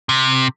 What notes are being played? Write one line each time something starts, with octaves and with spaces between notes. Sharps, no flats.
C3